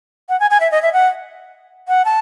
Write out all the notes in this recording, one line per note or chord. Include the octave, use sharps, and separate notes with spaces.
F#5
G#5
G#5
E5
D#5
E5
F#5
F#5
A5